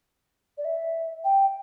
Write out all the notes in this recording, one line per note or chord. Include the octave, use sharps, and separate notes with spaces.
D5
E5
G5